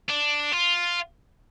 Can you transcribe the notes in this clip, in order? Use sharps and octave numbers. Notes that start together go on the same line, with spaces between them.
D4
F4